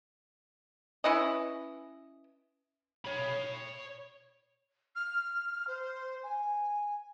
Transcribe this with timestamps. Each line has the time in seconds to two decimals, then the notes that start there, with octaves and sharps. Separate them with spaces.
1.04 C#4 E4 B4 D#5
3.05 C#5 B5
4.95 F6
5.67 C5
6.23 G#5